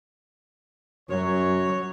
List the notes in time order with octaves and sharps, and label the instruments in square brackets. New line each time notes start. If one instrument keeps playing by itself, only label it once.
[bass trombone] F#2 [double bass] F#3 [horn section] C#5